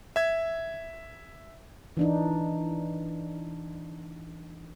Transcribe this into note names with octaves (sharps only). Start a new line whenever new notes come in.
E5 G#6
E3 D4 D#4